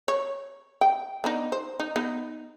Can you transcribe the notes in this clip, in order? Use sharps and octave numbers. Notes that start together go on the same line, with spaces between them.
C#5
G5
B3 D4 D#4
C5
D#4
B3 D#4